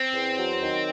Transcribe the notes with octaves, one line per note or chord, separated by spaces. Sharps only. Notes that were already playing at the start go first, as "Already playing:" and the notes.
Already playing: C4
E2
F#3
D#3